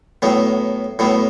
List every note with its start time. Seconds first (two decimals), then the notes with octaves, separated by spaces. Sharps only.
0.22 A2 F#3 B3
0.99 A2 F#3 B3